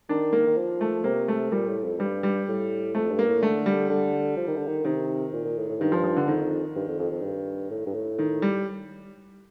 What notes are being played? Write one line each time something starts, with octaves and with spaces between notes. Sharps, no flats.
D#3 D4
A#3
D#3
F3
A3
C3 A#3
A3
A#2 G3
A2
F2
G2 G3
G3
A2
F2 A3
G2
A#3
A2
D3 A3
G3
D3
F3
D#3
D3
D#3
C3 D#3
A#2
A#2
A2
A2
G2 D#3
F3
F3
D3
F2 D#3
G2
F2
F2
F2
G2
A2
G2
A2
D#3
G3